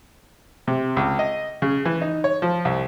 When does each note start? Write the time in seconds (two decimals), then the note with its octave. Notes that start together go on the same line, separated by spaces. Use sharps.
0.67 C3
0.97 C#2
1.19 D#5
1.62 C#3
1.85 E3
2.01 D#4
2.24 C#5
2.42 F3
2.65 C2